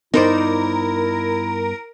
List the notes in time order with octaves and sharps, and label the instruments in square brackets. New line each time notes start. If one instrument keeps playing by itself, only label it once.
[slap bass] G2 B3 [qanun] D#4 C5 D5 [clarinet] E4 [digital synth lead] A#4